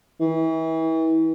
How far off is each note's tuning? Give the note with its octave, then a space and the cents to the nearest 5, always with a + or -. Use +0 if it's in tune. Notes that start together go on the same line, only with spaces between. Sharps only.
E3 -35